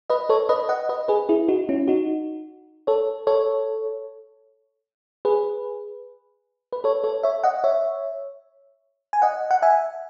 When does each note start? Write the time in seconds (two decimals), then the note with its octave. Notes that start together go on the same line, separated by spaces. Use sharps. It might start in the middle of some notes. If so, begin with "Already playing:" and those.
0.10 B4 D#5
0.29 A4 C#5
0.49 B4 D#5
0.69 D#5 F#5
0.89 B4 D#5
1.08 G#4 B4
1.29 E4 G#4
1.48 D#4 F#4
1.69 C#4 E4
1.88 D#4 F#4
2.87 A4 C#5
3.27 A4 C#5
5.25 G#4 B4
6.73 B4
6.84 A4 C#5
7.04 A4 C#5
7.23 C#5 E5
7.44 D#5 F#5
7.64 C#5 E5
9.13 G#5
9.22 D#5 F#5
9.51 F#5
9.62 E5 G#5